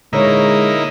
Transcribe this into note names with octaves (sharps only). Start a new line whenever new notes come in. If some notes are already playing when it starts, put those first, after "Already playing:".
A#2 D3 G#3 A#3 D#4 E4 C#5